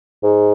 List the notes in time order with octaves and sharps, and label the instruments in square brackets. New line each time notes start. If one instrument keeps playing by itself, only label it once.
[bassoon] G#2